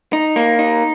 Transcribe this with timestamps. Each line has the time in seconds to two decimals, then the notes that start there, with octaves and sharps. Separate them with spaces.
0.13 D#4
0.36 A#3
0.59 D#4